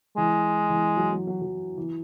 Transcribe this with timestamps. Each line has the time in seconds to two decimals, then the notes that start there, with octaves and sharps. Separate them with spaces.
0.17 E3 G#3
0.70 E3
0.97 F#3
1.13 F#3
1.27 F#3
1.41 F#3
1.77 E3